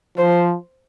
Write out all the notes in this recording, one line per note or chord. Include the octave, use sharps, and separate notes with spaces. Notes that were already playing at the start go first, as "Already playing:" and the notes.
F3 C5